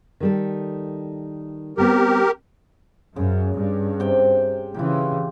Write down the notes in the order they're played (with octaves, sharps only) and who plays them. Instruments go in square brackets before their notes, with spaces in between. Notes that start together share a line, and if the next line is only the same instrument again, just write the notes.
[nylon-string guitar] D#3 G3 A4
[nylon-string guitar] G3 B3 C4 [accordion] G4 A#4
[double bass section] F#2 [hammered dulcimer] C#3
[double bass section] G2
[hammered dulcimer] C3 G5
[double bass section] C#3 E3 [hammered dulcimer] F4 G4